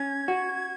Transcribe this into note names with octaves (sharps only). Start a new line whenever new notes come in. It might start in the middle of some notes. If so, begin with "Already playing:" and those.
Already playing: C#4 G#6
F#4